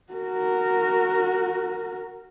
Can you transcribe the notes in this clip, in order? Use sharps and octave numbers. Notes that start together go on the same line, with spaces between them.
F#4 A#4